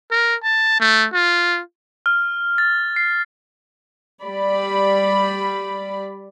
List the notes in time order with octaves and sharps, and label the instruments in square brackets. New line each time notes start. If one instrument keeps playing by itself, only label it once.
[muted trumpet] A#4
A5
A3
F4
[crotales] F6
A6
C7
[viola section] G3 D5 B5